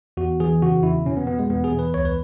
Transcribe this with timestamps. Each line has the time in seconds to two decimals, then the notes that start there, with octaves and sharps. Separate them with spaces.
0.17 E2 F#4
0.40 E3 G#4
0.62 C#3 F#4
0.83 E2 E4
1.06 B2 C#4
1.17 B3
1.27 B2 B3
1.39 G#3
1.49 E2 B3
1.64 G#4
1.71 E2
1.79 B4
1.94 C#2 C#5
2.05 B4